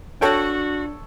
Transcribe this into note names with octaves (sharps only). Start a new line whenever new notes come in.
D4 F#4 A4 C#5 G5